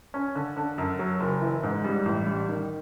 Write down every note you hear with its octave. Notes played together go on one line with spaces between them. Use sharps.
C#4
D3
D3
F#2
F#3
F#1
E3
G#2
G3
A1
G3
D#3